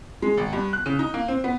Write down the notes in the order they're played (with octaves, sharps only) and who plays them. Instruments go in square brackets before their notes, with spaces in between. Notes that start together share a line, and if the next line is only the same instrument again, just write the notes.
[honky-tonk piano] G#3
G#1
G2
F#6
C#3
D#4
A#3
C4
B3